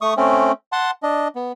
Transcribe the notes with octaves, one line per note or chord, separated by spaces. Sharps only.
A3 C#6 D#6
A3 C4 C#4
F#5 A5 C6
D4 D#5
B3